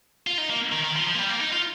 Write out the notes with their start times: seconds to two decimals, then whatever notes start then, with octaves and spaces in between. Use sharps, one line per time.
0.27 F4
0.38 D#4
0.50 A#3
0.72 D#3
0.84 D#3
0.96 F3
1.07 F3
1.14 A#3
1.19 G3
1.29 A#3
1.41 D#4
1.53 F4